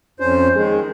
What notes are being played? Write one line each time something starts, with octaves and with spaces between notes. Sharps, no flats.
F2 C#4 C5
D#3 G#3 G#4